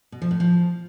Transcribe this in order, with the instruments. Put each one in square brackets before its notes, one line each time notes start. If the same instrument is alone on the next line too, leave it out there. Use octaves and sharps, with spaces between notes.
[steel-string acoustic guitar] B2
F3
A2
F3